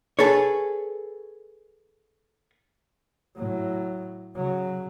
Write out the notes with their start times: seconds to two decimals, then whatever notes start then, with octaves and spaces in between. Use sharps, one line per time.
0.19 G#4 A4 B4 C#5
3.36 A2 F#3
4.36 C#3 F#3